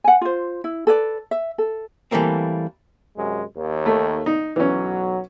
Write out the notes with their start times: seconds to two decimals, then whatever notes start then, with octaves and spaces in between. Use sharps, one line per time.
0.04 F#5 G#5
0.21 F4 C5
0.64 E4
0.87 A4 B4 D5
1.31 E5
1.58 A4
2.11 E3 G3 A3 A#3 C4
3.16 F#2 C3 G#3
3.56 D#2
3.86 A3
4.26 D#4
4.56 B1 E3 F#3 C#4